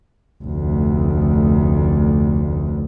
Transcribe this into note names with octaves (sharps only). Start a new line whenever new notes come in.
F1 D2